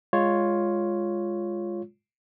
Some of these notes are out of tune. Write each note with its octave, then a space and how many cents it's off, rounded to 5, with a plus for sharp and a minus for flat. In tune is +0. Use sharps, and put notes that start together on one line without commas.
G#3 -10 F4 +0 C#5 +0